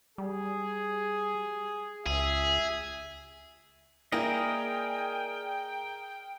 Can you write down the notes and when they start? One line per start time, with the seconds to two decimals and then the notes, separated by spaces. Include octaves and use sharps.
0.18 G3 G#4
2.06 C#2 G#4 E5
4.12 A#3 E4 G#4 A#4 D5 D#5 F5 G5